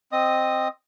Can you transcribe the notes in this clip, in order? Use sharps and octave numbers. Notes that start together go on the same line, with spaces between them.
C4 D#5 D#6